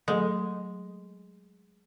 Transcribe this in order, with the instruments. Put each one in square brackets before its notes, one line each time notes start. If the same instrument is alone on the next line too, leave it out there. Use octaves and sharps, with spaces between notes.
[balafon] F#3 A3 A4 [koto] G#3